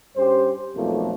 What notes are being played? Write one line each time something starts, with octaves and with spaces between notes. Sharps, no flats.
G2 C#4 G4 C5
B1 F2 A3 A#3 C4 F4